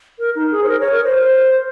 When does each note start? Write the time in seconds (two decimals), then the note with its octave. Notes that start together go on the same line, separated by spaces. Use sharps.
0.19 A#4
0.35 D#4
0.52 G#4
0.64 C5
0.68 A#4
0.80 C#5
0.92 A#4
1.04 C5
1.16 C5